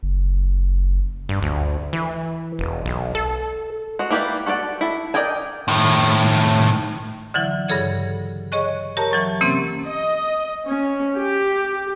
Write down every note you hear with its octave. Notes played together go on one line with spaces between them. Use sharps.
F#1
G2
D2
E3
E1
B1
A4
G#3 F#4
A#3 E4 G4 B4 D5
F#4 A4 B4 D5 F#5
E4 A4
A#4 D5 D#5 G5 G#5
A2 D#3
D3 E3 F#3 E4
G2 C#3 G#4 A4 C#5 G#6
G#4 C#5 D#5 C#6 F#6
G4 A#4 C#5 A5 A#5
E3 F#3 C#6
C3 E3 A#3 C4 C#4
D#5
C#4
G4